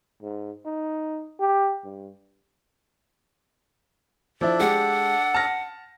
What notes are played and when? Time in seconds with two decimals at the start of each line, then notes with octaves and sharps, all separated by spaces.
0.22 G#2
0.66 D#4
1.40 G4
1.84 G2
4.41 F3 D4 E4 A4 D5
4.60 G#3 G4 F#5
5.34 A5 F6 A#6